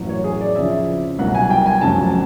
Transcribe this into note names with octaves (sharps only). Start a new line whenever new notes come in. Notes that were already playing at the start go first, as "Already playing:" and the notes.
Already playing: A1 A2 F#3
C#5
G#4
D5
F2 C#3 F3 E5
C2 B2 F#3 F#5
G#5
G5
G#5
F1 F2 C#3 F#3 A5